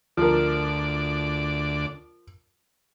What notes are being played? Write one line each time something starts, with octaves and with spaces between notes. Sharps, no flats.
D2 F3 A#4 D5